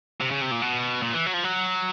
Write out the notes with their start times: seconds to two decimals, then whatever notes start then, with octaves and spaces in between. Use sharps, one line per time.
0.21 C3
0.31 C#3
0.41 C3
0.51 A#2
0.62 B2
1.02 A#2
1.13 E3
1.26 F#3
1.33 F3
1.44 F#3